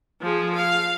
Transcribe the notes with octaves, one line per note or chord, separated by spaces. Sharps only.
F3 G#4
F5